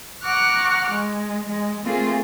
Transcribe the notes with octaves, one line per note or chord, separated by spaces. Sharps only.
F#5 A#5 C#6 D6 F6 F#6
G#3
G#3
A3 A#3 C4 F4 G#4